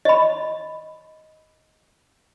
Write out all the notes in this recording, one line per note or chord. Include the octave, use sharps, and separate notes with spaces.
D#5 B5